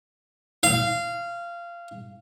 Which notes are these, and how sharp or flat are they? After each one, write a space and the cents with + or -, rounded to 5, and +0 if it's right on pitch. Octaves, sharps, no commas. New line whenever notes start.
F5 -20